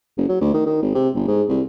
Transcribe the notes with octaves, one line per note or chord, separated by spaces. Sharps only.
F#1
F#3
D2
D#3
D#3
G#1
C3
G1
G#2
C2